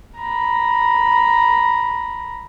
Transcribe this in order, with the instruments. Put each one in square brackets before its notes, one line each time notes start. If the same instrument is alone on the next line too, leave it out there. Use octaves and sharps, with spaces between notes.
[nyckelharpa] A#5 B5